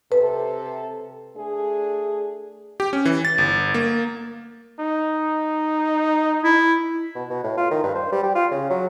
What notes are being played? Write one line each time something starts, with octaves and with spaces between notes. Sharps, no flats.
C3 A4 B4
A3 D4 G#4
G4
C#4
E3
A6
G1
A#3
D#4
E4
B2
B2
A2
F4
D#3
G2
C5
G3
G4
F4
C#3
F#3